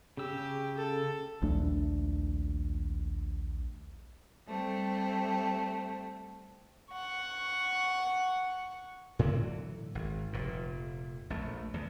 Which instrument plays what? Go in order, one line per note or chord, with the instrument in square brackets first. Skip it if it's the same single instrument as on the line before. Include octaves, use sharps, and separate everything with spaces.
[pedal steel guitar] C#3 E6 [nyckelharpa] G4
[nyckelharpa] A4
[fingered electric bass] A#1 D#2 A3 D4
[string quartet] G3 A3 C4
[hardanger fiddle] F#5 C#6
[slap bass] A2 D3 E3 F#3
G#1
F1 A#2
A#1 A3
E2 D3